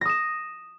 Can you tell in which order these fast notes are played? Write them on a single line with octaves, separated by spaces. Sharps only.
A#6 D#6 E7